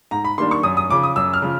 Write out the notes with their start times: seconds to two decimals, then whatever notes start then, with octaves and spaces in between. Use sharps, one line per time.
0.11 G#2 A#5
0.24 B5
0.38 D#3 G3 A#3 D4 C6
0.51 C#6
0.63 F#2 D#6
0.77 D#6
0.89 C#3 F3 D6
1.03 D#6
1.16 F#2 E6
1.34 F6
1.42 C#3 F3